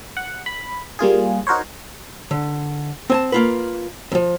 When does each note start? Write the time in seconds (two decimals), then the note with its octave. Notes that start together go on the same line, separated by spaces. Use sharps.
0.17 F#5
0.46 B5
0.99 G3 A#3 F4 G#4
1.47 D#4 F#4 A#4 C5 C#5
2.31 D3
3.10 C4 G#5 A5
3.32 A#3 F4 B4
4.12 E2 F3